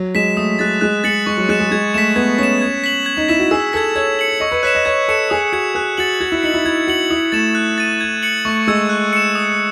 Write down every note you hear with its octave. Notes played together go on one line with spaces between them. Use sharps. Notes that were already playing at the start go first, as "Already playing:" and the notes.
Already playing: F#3
G#3 B6 E7
A3 D#6
G#3 F#6 A6
G#3 F#6
G#3 A6 C#7 F#7
G#3 C#6
F#3
G#3 F#6 C#7 E7
G#3
G#3 G#6
A3 B6 E7
B3 G#6
C#4 B6 E7
G#6
B6 F#7
G#6
D#4
E4 B6 E7
F#4
G#4 E6
A4 G#6 B6
C#5 G#6
C#7 F#7
D#5 C#6
B4
C#5 F#6 B6 E7
D#5
C#5 G#6
A4 C#7 E7
G#4 D#6
F#4 G#6 C#7
G#4 F#6
F#4 A6 C#7 F#7
F#4 G#6
E4
D#4 C#7 F#7
E4
E4 G#6
F#4 C#7 F#7
E4 D#6
A3 A6 E7
F#6
A6 D#7
G#6
C#7 F#7
A3 C#6
G#3 E6 G#6
F#6
C#7 E7
D#6